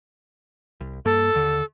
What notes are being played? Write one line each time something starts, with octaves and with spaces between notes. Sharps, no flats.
C2
G2 A#3 A4
D#2 D3